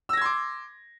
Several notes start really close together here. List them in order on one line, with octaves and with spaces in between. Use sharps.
E6 A#6 G#6 C6 D6